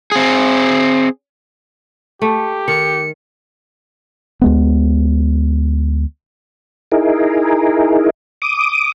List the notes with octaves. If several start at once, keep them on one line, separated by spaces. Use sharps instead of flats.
C4 G#4
A3 G4
D#3 C#7
D2 G#3 B3
D#4 E4 G#4 A#4
D6 D#6